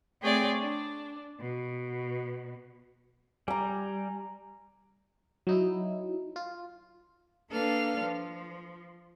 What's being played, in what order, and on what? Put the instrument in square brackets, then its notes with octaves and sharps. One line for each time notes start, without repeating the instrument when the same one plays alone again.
[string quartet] A3 C4 G#4 C#5 D5 G5
D4
B2
[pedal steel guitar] G3 [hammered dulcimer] G#5 A#5
[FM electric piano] F#3 D#4 E4
F4
[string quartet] A#3 D4 A4 B4 F5 F6
F3